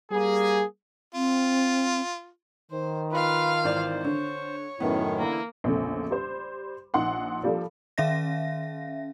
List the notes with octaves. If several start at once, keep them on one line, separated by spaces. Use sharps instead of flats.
G3 A#3 G#4
C4 F4
D#3 C5
F4 B4 F5
G#1 E3 C5 D5
D3 C#5
F#2 A2 D#3 B3 C#4 E4
D3 E3 A#3 E4
A#1 E2 C#3 A3
G3 C5
A#1 D#4 F#5 C6
F3 G3 A#3 D4 A4
D#3 C#4 E5 F5 A#6